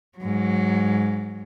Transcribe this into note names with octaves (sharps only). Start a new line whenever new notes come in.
G#2 F#3